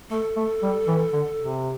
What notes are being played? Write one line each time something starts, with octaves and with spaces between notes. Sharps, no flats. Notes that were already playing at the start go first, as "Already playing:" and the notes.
A3 A4
A3
G3
E3
D3
C3